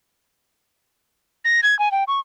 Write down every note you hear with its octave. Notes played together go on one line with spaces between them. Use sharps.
A#6
G#6
G#5
G5
C#6